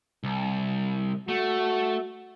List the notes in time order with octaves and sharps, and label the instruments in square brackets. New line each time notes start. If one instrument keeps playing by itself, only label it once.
[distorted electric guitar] C2
[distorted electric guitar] A3 [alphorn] F#4